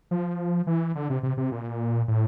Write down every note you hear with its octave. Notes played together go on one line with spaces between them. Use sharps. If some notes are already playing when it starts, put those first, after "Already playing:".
F3
E3
D3
C3
C3
C3
A#2
A2